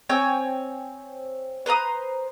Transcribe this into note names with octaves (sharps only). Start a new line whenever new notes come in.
C4 C#5 G5 G#5
B4 C5 A#5 D#6